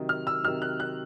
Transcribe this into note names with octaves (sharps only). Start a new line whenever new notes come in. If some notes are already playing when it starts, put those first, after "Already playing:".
Already playing: C3 D#3 F#3
F6
E6
C3 D#3 F#3 F6
F#6
F#6